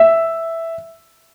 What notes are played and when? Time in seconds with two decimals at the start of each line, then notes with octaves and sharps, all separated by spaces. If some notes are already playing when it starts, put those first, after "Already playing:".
Already playing: E5